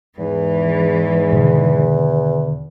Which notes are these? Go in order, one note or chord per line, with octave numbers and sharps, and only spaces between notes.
E2 G#2 E3
B2 D3 D#3